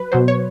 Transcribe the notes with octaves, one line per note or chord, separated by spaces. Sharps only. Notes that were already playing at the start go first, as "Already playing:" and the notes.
Already playing: F#3 B4
B2 F#3 C5
C#5